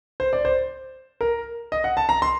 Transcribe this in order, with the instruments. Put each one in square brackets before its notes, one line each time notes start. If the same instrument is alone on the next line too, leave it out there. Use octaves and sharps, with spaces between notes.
[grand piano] C5
D5
C5
A#4
D#5
F#5
A5
A#5
C6